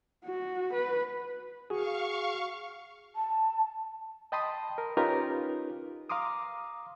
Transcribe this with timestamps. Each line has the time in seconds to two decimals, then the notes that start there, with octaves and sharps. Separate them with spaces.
0.25 F#4
0.73 B4
1.70 F#4 G#4 F5 C#6
3.16 A5
4.32 D#5 G5 A5 B5 C6 D#6
4.78 A#4
4.97 C#4 D#4 F4 G4 A#4 B4
6.10 F5 A#5 C6 D6 D#6